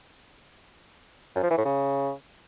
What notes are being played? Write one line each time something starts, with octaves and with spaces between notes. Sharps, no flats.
F#2
F3
E3
A2
C#3